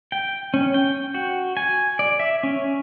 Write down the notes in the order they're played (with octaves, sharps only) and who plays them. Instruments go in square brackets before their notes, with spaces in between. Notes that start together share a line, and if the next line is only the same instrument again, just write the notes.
[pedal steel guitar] G5
C#4
G5
F#4
G#5
D5
E5
C#4